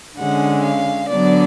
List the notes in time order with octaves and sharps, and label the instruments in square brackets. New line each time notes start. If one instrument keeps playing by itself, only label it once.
[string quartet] D3 G#3 C#4 F#5
F5
D3 F#3 B3 D4 D5